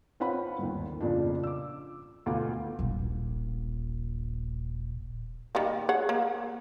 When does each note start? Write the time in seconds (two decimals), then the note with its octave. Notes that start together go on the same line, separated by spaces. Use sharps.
0.20 C4 F4 B4 C#5 F#5 B5
0.59 G1 D#2
1.01 F2 A#2 C#3 F3 D4
1.44 D6 E6
2.26 D2 B2 F4 D6
2.79 D#1 A#1
5.55 D#3 G3 A#3
5.89 G#4 C#5 F#5
6.09 A#3